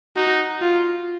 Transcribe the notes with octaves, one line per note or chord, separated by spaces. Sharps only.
D#4 F#4
F4